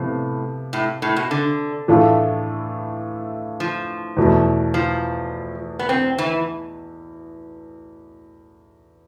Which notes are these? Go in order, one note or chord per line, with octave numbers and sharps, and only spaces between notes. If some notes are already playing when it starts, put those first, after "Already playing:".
Already playing: A2 C3 F3 B3
A2
A2
B2
D3
A2 E3 A3 D4 F4
F3
E2 B2 A3
F3
B3
C4
E3